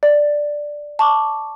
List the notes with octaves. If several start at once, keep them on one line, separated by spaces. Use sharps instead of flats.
D5
A5 C#6 D6